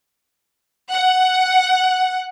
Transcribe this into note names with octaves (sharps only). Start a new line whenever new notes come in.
F#5